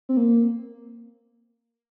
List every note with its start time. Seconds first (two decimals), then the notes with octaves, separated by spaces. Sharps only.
0.09 C4
0.17 A#3